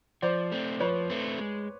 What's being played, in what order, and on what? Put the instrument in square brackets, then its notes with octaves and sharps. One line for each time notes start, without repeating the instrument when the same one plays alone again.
[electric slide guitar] F3 [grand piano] C5 D5
[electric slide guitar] A3 C4
[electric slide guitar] F3 [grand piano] B4 C#5
[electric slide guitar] A3 C4
G#3